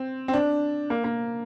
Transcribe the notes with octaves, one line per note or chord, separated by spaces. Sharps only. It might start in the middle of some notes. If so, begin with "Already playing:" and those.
Already playing: C4
C4
D4
A#3
A#3